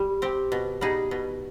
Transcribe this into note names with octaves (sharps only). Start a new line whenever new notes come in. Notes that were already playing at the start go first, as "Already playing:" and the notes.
Already playing: G3
C4 G4
B2
G3 B3 D#4 G#4
B2